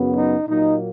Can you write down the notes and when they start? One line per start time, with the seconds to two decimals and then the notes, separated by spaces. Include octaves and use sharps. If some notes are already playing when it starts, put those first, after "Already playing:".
Already playing: F#2 C#3 F#3 B3
0.17 D#4
0.47 A#2 F#3 A#3 D#4